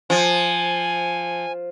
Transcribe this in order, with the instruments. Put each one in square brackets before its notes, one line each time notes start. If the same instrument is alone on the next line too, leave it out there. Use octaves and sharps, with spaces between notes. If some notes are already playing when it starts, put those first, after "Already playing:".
[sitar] F3 [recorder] G#5